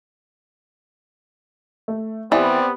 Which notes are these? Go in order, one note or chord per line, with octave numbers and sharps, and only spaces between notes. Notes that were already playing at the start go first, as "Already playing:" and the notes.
A3
E3 B3 C4 G4 D5